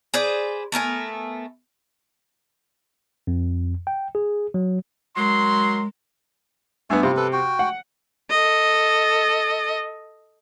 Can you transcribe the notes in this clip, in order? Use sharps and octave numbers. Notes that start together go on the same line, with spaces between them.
G#4 B4 C5 D5
A3 B3 A#4 G#5
F2
G5
G#4
F#3
F#3 G#3 A#4 C6
G2 B3 E5 G#5
C3 E4 F4
A4 B4
F#4 G5
F#5
A4 D#5